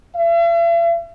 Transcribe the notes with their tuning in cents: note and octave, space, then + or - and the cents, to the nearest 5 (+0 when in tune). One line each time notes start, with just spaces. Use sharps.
E5 +45